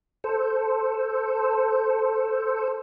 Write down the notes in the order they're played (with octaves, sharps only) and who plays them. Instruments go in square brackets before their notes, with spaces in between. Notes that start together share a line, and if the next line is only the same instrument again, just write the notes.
[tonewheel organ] A4 C5